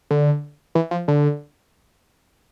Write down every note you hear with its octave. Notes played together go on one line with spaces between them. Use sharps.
D3
E3
F3
D3